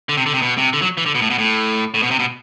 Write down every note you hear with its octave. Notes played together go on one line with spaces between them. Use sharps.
D3
C3
D3
C3
B2
C3
D3
F#3
E3
D3
B2
A2
B2
A2
A2
B2
C3
B2